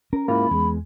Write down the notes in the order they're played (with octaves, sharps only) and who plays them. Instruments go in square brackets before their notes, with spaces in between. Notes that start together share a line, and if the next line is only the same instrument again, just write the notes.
[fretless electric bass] C#4 [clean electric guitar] A#4
[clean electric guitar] D2 G#2 F4 [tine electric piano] A#3 E4 [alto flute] B5
[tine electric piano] E2 [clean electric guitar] G#3